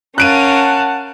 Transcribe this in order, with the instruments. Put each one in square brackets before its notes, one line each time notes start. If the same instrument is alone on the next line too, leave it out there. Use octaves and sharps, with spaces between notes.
[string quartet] C#4 A#4 F5 [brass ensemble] F#5 A5 [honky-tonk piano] F#6 D7 D#7